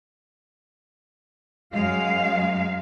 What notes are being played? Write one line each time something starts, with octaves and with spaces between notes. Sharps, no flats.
F#2 G#3 F5